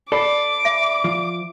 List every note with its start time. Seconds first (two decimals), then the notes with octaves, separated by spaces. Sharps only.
0.12 A4 D5 B5 D6 C7
0.65 E5
1.04 F3